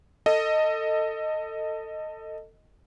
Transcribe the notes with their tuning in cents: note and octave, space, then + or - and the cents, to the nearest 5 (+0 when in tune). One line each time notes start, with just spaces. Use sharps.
A4 +25 D#5 +0